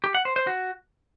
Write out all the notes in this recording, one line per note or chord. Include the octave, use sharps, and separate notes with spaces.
G4
F#5
C5
C5
F#4